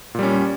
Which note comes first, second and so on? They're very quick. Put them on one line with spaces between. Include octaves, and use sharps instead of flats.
A#2 G3 C#4